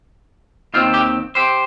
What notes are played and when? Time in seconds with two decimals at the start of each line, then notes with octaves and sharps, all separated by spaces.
0.74 D#2 D#3 C4 F4
0.94 G4
1.35 G4 C5